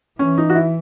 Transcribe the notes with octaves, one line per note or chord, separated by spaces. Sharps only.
E3 C#4
D#4
F#4
E4